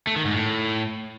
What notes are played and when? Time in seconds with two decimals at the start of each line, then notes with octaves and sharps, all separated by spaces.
0.07 A3
0.16 D#3
0.25 G#2
0.34 A2